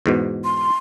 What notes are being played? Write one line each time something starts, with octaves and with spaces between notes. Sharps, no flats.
E2 G#2 B2
C6